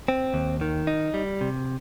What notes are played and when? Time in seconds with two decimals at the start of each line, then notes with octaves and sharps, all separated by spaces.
0.08 C4
0.34 D#2
0.61 D#3
0.87 D#4
1.14 G3
1.41 C3